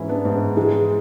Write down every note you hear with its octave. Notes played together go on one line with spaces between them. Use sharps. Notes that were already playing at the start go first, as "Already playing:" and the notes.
Already playing: G#2 E3 C#4 E4
B3 D4
G#2
E3 G#3